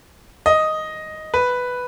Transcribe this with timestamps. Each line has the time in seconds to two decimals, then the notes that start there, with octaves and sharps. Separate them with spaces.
0.46 D#5
1.34 B4